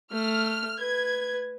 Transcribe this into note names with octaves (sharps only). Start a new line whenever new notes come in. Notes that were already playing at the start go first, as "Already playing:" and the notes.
A3 F6
B4 G#6